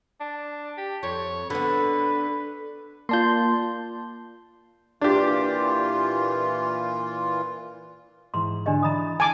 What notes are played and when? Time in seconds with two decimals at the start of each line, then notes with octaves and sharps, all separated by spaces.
0.20 D4
0.78 G4
1.03 F2 C#5
1.50 D3 B3 B4
3.09 A#3 F4 D5 A5 C6 G6
5.01 A#2 E3 D4 F4 G4
8.34 G#2 E3 C6
8.66 D3 D4 G4 D#5
8.83 E3 A#5 B5 D#6 A6
9.20 G#5 A5 D6